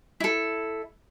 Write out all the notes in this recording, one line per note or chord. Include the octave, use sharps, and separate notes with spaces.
E4 A4